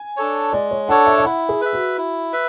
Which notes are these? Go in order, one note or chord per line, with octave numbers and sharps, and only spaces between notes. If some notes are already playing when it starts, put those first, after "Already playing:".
Already playing: G#5
D4 A4 C#5
G#3 D5
C#5
D4 A4 C#5 F#5
E5
E5
E4 F#5
G#4
B4 E5
F#4
E4
B4 E5